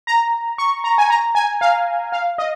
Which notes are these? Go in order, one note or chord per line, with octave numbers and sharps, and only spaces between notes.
A#5
C#6
A#5
G#5
A#5
G#5
F5
F5
D#5